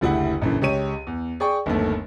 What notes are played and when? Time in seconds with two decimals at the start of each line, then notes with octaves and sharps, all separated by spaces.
0.01 F#1 D2 E4 G4 F#5
0.42 A#1 F#2 D3 E3
0.62 C#2 G4 C#5 D#7
1.07 E2
1.40 G#4 D5 G5 C#6
1.66 G1 D#2 A3